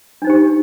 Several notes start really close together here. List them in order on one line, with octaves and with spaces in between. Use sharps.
D4 D#4 C5 G4